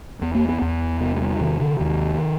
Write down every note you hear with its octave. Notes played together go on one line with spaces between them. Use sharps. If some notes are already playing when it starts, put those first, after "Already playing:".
E2 B3
A#3
B3
E2
C3 B3
G#3
G3
C3 D#3
D3
D#2 D#3